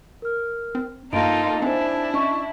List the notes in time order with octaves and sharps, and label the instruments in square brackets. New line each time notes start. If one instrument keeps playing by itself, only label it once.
[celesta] A#4 F6
[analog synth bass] C4
[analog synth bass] G2 [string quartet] A#3 F4 A4 [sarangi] D#4 [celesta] A#6 D7
[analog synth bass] C4 [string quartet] D4 [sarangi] E4 [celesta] C5 G#5
[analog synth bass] C#4 [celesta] D#5 C#6